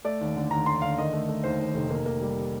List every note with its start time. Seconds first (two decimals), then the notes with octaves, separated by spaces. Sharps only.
0.04 A3 D5
0.21 D#2
0.36 D3
0.51 D#2 A#5
0.66 D#2 C6
0.82 D3 F5
0.98 D#3 D#5
1.13 A3
1.29 A3
1.44 D#2 C5
1.60 D#2
1.75 F1
1.90 A#3
2.06 A#3
2.21 G3